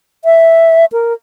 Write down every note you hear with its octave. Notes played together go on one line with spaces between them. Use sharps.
E5
A#4